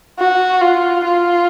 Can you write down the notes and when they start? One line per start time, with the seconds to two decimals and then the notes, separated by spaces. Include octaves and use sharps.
0.19 F#4
0.61 F4
1.05 F4